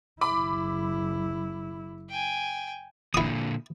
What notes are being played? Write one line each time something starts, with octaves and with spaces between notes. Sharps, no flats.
F#1 E4 B5 D6
G5 G#5
A#2 D3 E4 D#6